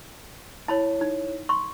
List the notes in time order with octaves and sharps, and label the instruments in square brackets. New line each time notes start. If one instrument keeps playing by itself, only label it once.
[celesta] E4 C#5 [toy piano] A5 B5
[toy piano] D#4
C6 C#6